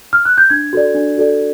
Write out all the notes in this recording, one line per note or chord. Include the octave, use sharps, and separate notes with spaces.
F6
F#6
G6
D4 G#6
F#4 A4 D5
D4
F#4 A4 D5